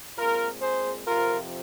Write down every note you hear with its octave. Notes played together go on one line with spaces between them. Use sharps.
A#2 G#3 C4 F4 A#4
G#4 C5
F2 C3 F3 F4 A#4